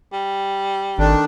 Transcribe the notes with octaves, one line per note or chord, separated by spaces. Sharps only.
G3
G#1 D#3 A3 D4